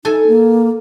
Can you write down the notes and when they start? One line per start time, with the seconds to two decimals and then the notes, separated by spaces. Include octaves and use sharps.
0.05 D#4 A4 G#5
0.27 A#3